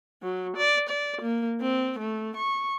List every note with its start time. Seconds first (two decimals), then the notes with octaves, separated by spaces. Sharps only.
0.22 F#3
0.57 D5
0.89 D5
1.21 A#3
1.61 C4
1.99 A3
2.37 C#6